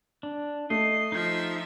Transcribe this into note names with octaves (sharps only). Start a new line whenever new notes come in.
D4
A3 D#5 C7
F3 D#4 E5 G6